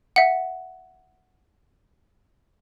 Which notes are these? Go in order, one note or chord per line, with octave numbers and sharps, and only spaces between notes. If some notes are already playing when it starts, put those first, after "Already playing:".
E5 F#5